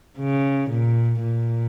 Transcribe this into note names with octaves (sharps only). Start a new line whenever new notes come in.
C#3
A#2
A#2